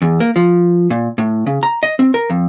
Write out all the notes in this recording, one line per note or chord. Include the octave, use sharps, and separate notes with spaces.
E2
A#3
F3
A#2
A2
C#3
A#5
D#5
C4
A#4
F2